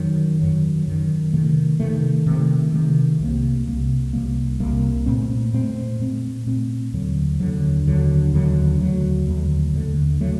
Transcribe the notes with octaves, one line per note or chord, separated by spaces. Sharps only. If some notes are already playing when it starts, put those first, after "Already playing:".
Already playing: F#2 D#3 F#3
F#2 D#3 F#3
F#2 D#3 F#3
C3 D#3 A3
C3 D#3 A3
C3 D#3 A3
C3 D#3 A3
C2 C3 G3 A#3
C2 C3 G3 A#3
C2 C3 G3 A#3
C2 C3 G3 A#3
A#2 A3 C4
A#2 A3 C4
A#2 A3 C4
A#2 A3 C4
D#2 D3 F#3
D#2 D3 F#3
D#2 D3 F#3
D#2 D3 F#3
D#2 D3 F#3 A3
D#2 D3 F#3 A3
D#2 D3 F#3 A3
D3 F#3 A3